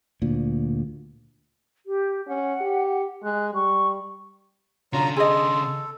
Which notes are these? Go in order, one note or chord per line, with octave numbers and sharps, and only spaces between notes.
D2 A#2
G4
C#4 F#5
G4
G#3 F#6
G3 C#6
C#3 F#3 D4 F4 A#5
G#4 A4 D#5 C6